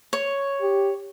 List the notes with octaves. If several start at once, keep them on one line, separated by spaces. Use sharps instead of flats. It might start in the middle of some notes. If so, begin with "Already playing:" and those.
C#5
G4